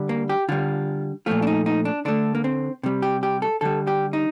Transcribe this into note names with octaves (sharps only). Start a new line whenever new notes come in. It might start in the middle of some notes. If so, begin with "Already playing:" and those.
Already playing: D3 G3
A#3
G4
D3 G3 F4
A#2 F3 A3 F4
D4
D#4
D#4
D4
D3 A3 D4
A#3
C4
C3 G3
G4
G4
A4
D3 G3 A4
G4
D#4